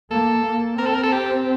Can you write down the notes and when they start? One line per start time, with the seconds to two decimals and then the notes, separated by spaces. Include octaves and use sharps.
0.11 A#3 A4
0.45 A#3
0.78 C4 A#4
0.86 A4
0.95 A#4
1.03 A4
1.12 G4